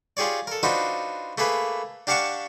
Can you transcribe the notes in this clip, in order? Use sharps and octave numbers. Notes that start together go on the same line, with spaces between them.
F4 G4 G#4 C#5 D5
A4 A#4
D4 D#4 F4 F#4 B4 C5
A3 A#3 G#4 B4
D4 G4 F5 F#5 A5 C#6